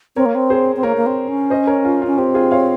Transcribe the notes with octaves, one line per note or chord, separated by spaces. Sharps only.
C4 A#4 C#5
A#3
C4
G#4 C5
C4
A#3 A#4 C#5
A#3
C4
C#4
C5 D#5
A#4 C#5
F4
C#4 F4
C4 G4
F4 G#4
C#5 F5